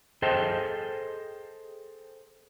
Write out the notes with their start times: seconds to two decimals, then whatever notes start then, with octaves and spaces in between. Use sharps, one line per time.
0.22 G#4 A4 C5 D#5 G5 A5